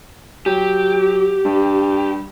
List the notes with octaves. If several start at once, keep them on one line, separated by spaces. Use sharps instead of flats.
F#3 G4
G2